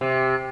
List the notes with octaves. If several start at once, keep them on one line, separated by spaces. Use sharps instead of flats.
C3